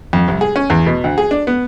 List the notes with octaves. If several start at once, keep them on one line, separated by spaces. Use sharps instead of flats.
F2
C2
G#4
C#4
E2
B2
D2
G#4
D4
B3